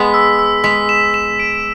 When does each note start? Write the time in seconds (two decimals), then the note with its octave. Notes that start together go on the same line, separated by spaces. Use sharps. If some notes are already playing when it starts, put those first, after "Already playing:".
Already playing: G#3 B3 B6
0.14 E6
0.39 E6
0.64 G#3 B6
0.89 E7
1.14 E7
1.39 D7